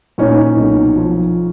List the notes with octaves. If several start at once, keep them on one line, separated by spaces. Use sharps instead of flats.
A#2 C#4 D#4
B1
F3